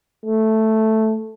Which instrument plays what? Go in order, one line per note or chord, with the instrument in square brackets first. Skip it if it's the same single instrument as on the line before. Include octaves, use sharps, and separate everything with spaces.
[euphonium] A3